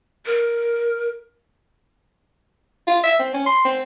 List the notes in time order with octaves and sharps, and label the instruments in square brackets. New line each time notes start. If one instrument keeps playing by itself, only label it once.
[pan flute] A#4
[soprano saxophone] F4
E5
C4
C#4
C6
C4